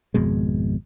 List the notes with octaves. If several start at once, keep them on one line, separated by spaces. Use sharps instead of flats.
G#1 F2 B2 G#3